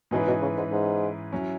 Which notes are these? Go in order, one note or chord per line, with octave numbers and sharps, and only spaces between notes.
G#2 B2 E3 C#4 G#4 B4
B2
C#3
G#2
G#2
F#3 C#4 E4